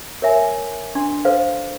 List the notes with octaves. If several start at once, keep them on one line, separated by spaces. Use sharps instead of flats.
A#4 C#5 E5 G#5
D4 C6
A4 B4 C5 D5 F5